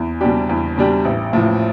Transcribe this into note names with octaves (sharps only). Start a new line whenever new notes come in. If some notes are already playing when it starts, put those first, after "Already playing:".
Already playing: E2
B2 G3 D4 G4
E2
B2 G3 D4 G4
A1
A2 F3